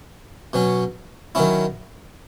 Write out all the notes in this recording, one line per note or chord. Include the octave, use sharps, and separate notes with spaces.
B2 F#3 C#4
D#3 F#3 C#4 E4